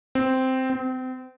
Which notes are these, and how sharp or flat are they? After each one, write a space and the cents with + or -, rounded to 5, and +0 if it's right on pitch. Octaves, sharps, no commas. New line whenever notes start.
C4 -5
C4 -30